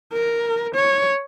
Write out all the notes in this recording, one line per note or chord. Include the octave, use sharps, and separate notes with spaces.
A#4
C#5